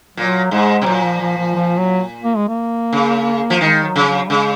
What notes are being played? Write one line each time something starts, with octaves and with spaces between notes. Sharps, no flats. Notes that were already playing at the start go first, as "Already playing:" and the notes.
A#2 F#3
G#2 G#3
C3
A#2 F#3
F3
F3
F3
F3
F#3
A#3
G#3
A#3
C#3
F3
D#3 G#3
F#3
C#3
F#3
C#3 G#3